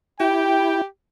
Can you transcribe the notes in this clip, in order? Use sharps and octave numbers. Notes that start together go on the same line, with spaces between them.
E4 G4 G5